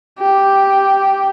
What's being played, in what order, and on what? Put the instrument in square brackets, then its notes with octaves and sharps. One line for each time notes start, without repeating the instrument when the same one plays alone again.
[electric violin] G4